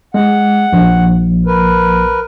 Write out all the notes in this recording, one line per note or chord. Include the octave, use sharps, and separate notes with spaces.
G#3 F#5
A#1
A#4 B4